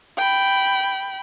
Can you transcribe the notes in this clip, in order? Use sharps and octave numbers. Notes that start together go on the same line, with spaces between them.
G5 B5